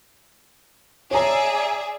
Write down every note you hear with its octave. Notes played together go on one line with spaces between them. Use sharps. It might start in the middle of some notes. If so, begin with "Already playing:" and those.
G#4 C#5 D5 E5 A#5